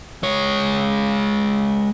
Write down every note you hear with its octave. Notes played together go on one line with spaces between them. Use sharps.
G#3 C#5